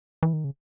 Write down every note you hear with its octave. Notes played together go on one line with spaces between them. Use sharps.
E3
D#3
C#3